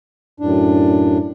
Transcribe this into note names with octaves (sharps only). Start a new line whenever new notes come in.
F#2 A2 D4